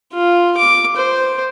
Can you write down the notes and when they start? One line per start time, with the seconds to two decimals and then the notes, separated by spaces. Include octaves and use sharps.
0.13 F4
0.58 D6
0.96 C5